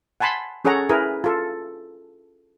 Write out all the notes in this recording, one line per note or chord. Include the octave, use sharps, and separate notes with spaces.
F#5 G#5 A5 B5 C6
C#4 G#4 A4 C#5 F#5 A#5
E4 G#4 A#4 B4 G#5
F4 A4